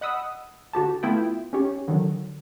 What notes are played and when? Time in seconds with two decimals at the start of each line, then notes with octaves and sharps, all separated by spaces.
0.01 D#5 F#5 B5 D#6 E6
0.73 D3 F#4 G4 A5
1.03 A3 B3 E4 F4 E5 G5
1.53 C#4 D#4 G4 C#5
1.88 D3 D#3 F#3